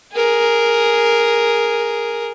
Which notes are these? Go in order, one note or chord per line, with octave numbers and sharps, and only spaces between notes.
G#4 A#4